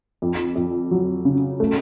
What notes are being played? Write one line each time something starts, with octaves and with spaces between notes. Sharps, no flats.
F2
F2
F#3
C#3
A3